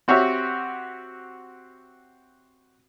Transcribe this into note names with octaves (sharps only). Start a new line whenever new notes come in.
C4 F#4 G4 C#5 E5